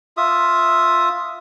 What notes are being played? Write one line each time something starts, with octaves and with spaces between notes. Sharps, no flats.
F4 E5 D#6